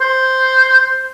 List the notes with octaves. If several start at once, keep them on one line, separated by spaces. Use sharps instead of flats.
C5